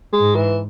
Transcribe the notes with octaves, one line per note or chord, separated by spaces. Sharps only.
G#3
G#2
E3